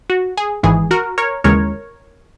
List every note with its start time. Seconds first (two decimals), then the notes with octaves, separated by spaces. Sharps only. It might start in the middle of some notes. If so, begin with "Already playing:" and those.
0.10 F#4
0.37 G#4
0.63 G#1 G#2 E3 G#4
0.91 F#4 A#4
1.18 A#4 C#5
1.44 D#2 C#3 E3 G#3 A#4 C#5